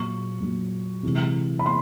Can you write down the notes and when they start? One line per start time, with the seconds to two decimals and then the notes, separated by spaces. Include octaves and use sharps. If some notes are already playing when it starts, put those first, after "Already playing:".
Already playing: A#2 F#3 C#6
0.40 A#2 F#3
1.03 C3 E3 G#3
1.59 B5
1.66 C6